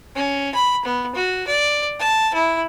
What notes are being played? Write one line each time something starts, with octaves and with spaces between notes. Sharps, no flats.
C#4
B5
B3
F#4
D5
A5
E4